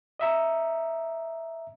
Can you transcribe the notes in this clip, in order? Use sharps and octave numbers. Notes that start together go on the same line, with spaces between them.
D#5 E5 A#5